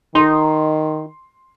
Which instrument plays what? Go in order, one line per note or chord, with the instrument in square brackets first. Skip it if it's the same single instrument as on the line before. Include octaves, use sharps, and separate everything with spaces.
[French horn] D#3 [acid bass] D#4 [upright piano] C6